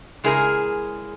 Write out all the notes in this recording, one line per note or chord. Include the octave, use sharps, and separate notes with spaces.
C#3 G#3 E4 G#4 A#4